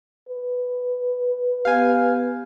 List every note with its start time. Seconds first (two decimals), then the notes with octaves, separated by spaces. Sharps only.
0.29 B4
1.65 B3 G4 F5 G#5